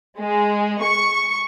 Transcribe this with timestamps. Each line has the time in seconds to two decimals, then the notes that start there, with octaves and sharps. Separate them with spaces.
0.20 G#3
0.82 C#6